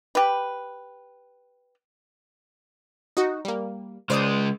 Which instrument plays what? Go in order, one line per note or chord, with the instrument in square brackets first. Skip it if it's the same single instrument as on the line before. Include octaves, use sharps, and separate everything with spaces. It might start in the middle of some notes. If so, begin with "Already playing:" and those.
[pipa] G4 B4
[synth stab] D#4 F#4
G3 A#3
[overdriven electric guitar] C#3 G#3 [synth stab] C5 D5 D#6